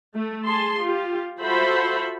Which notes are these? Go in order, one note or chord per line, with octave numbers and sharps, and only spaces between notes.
A3
G#4 A5 C6
F4 G4
F4 F#4 A4 C5 E5 B5